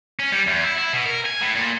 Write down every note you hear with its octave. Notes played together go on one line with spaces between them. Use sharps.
C#4
G3
E2
E4
E4
B2
A#4
G#5
A2
A#2